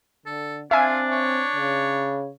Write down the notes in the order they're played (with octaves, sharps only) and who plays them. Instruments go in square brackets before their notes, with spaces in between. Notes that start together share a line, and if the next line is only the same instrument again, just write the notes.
[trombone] D3 [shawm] A4
[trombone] C4 [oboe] D4 [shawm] F4 [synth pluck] E5 F5 G#5
[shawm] C#5
[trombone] C#3